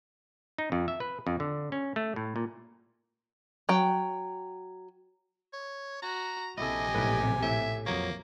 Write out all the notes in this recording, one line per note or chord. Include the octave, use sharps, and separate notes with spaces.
D#4
F2
E5
B4
F2
D3
C#4
A3
A2
A#2
F#3 G5
C#5
F#4 A#5
A#1 C3 E4 G4 A4 D#5 G#5
B1 A2 B4
A2 E5
F2 F#3 A#3 C#5